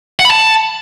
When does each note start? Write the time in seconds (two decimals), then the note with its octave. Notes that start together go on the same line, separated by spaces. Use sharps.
0.20 F#5
0.25 B5
0.30 A5